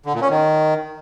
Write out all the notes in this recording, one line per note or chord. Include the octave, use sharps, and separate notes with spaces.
D3
A#2
C#4
D#3